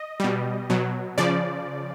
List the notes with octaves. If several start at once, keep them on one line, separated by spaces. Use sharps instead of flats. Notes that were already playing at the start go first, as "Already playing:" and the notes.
Already playing: D#5
B2 G3
B2 F#3
C#3 F3 D5